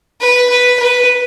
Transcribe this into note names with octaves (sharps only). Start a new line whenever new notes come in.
B4
B4
B4